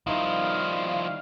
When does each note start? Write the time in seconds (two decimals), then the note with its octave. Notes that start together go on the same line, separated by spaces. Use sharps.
0.07 D#3 F3 G3 D#4 E4 F5 C6